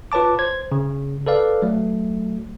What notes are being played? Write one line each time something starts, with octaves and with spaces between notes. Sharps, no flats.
F4 B4 C#5 A5 D6
C5 G#6
C#3
A4 B4 D5 F5
F#3 A3